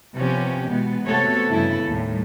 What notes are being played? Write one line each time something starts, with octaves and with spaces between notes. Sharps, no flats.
C3 F3 B3 C#4 G4
B2 E3 G#3 B3
C3 A3 B3 F#4 A4 C#5
G2 C#3 A3 B3 E4 A4
D#2 A2 G3